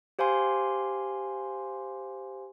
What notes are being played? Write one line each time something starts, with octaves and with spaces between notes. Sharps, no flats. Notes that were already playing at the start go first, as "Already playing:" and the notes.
G4 C5 F5 G#5 C6